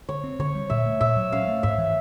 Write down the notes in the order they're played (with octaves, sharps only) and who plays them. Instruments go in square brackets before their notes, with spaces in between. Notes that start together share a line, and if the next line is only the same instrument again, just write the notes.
[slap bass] D3 [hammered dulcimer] C#5
[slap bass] C4
[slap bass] D3 [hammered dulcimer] C#5
[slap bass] G3
[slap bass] A#2 [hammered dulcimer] E5
[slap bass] A3
[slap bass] A#2 [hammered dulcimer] E5
[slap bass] F#3
[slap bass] C#4 [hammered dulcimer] F5
[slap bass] A3
[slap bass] G#2 [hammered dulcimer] E5
[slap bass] E3